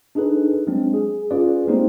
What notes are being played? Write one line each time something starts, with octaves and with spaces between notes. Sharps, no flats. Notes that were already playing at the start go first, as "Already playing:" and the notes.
D4 D#4 G#4 A4 B4
F#3 G#3 C4 D4
G#4
C#4 F4 G#4 B4 D5
G#3 A#3 C4 D#4 G4 C5